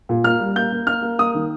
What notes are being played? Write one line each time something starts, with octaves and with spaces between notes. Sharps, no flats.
A#2
A#3 F6
G3
A#3 G6
A#3
A#3 F6
A#3
A#3 D#6
D#3